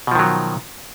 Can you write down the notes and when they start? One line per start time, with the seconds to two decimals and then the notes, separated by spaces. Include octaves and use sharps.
0.07 B2
0.11 F3
0.15 D#3
0.19 F#3